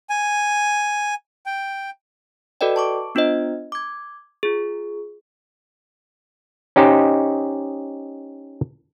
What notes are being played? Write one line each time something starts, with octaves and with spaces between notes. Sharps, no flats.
G#5
G5
F#4 A4 B4 D5 D#5 G5
A5 C#6 D6
B3 D4 F4 C5 D#5
D6 G#6
F4 G#4
C#4 D#4 G4 C5 D#5